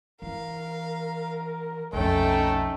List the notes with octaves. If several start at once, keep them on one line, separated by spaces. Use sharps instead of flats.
E3 A#4 F5
B1 F2 A3 C#4 D#4 A4 G5